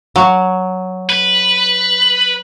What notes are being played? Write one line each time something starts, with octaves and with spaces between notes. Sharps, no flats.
F#3
B4